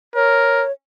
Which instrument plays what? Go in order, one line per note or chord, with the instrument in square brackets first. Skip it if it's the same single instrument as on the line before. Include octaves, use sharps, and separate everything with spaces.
[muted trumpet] A#4 [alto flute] C#5